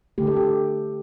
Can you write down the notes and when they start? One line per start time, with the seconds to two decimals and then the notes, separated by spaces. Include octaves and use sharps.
0.18 D3 A3 G4
0.27 A4
0.37 G4